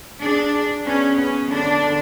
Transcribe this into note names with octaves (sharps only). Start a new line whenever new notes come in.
D4 G#4
G#4
B3 C#4
B3 C#4
D3 D4
D3